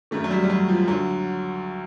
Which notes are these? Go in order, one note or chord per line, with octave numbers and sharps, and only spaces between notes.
F#2 D#3 A3
F#3
G3
G3
F#3
F3
D2 D3 F#3